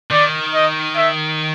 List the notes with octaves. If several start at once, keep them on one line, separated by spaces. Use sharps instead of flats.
D#3 D5
D#5
E5